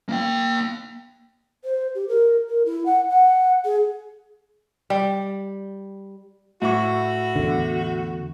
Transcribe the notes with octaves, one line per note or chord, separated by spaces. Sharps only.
A#3 G5
C5
G4
A#4
A#4
E4
F#5
F#5
G#4
G3
A2 E4 F#4 C#6
E2 D3